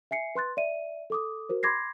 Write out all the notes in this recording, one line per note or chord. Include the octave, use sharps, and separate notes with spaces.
E5 G#5 C7 C#7
B4 C6 F#6 A6
D5 E5 D#7
A4 D6 D#6
F#4 A#4 C5
B5 C6 D6 G#6 A#6 C7